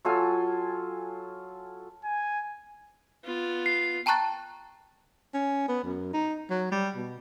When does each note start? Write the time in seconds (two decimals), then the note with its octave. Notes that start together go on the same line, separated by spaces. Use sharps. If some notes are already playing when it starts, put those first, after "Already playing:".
0.05 F#3 F4 A4 G#5
2.04 G#5
3.25 B3 F4
3.66 C7
4.06 G5 A5 A#5 C#6 F#6 A6
5.34 C#4
5.68 B3
5.84 F#2
6.13 D#4
6.50 F#3
6.72 G3
6.96 B2